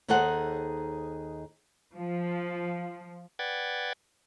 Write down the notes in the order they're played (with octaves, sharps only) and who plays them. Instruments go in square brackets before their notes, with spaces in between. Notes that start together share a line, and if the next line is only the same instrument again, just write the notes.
[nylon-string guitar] D#2 D#4 G#4 A4 C5 F#5
[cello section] F3
[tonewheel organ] B4 D5 F#5 G5 G#6 A6